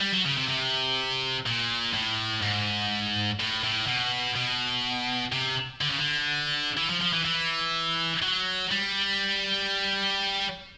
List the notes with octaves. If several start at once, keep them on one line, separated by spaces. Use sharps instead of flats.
G3
F#3
C#3
C3
C3
A#2
A2
G#2
A2
A2
B2
B2
C3
D3
C#3
D3
E3
F3
F3
E3
E3
F#3
G3